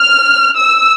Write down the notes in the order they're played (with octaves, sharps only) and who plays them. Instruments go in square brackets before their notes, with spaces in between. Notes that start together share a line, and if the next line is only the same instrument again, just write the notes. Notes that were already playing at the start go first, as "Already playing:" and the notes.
Already playing: [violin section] F6
E6